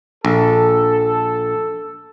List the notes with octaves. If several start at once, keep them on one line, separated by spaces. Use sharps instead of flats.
A#1 A4